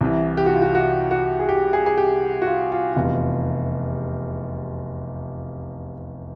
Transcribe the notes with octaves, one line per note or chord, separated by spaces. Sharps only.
C2 C3 E3
G4
F#4
F4
F#4
F#4
F#4
G#4
G4
G#4
G#4
G4
F#4
F4
F4
F1 E2 C3 F4